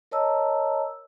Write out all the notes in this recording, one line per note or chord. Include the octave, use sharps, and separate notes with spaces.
A#4 C#5 D#5 A5 A#5 E6